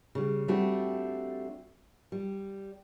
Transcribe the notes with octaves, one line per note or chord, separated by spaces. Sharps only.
C#3 G3
G3 A3 C4 D4 F#4
G3